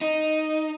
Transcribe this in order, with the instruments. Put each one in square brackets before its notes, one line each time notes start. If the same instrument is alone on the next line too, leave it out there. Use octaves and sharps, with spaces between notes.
[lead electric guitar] D#4